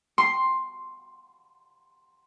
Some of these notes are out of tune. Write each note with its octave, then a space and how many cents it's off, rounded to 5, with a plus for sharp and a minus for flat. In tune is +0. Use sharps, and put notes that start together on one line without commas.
C6 +5